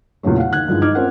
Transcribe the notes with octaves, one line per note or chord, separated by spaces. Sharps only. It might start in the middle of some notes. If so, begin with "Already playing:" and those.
E2 A#2 C#3 F#3 A3
F5 F#5
D#3 F#6 G#6
G2 D#3 F3 G#3 E4
D#4 D#5 D6 F6 G#6
C4 C#4 F4 A#4 F#5